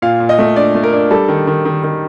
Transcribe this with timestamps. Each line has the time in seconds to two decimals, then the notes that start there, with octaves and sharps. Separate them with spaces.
0.02 A#2 F5
0.20 A#2
0.29 D#5
0.39 A3
0.56 D4 D5
0.75 A3
0.84 A#4
0.93 D4
1.11 G3 A4
1.28 D#3
1.47 D#3
1.65 D#3
1.83 D#3